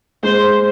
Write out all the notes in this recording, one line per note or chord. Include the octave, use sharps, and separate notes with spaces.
G#3 C5